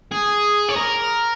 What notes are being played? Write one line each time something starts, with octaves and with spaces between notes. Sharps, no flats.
G#4
C#5
A#4